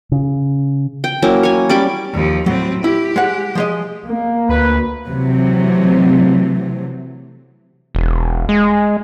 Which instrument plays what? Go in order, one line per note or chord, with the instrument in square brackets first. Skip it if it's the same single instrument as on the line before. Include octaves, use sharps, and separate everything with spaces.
[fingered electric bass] C#3
[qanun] G5
F#3 A#3 C#4 E4
C#5 G#5
G3 C#4 B5 D6
[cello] D#2 F3
[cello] A2 C4 [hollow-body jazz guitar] F#3
[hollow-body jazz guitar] E4 [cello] G4
[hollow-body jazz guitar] G#3 F#5
F3 G#3 D#5
[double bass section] A#3
[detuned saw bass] D2 [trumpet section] B4
[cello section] C3 E3 F#3 A3
[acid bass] E1
G#3